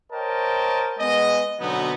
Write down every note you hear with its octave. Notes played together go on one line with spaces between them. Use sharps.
A#4 C5 C#5 D#5 G5 A5
G#3 B3 G#4 D#5
B2 D3 F#3 B3 C4 D#4